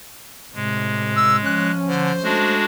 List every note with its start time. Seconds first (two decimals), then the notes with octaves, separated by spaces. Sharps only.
0.55 A2 C3 G#3
1.16 E6
1.45 F3 C#4 F#6
1.87 D3 C5
2.24 G#3 A3 D4 F#4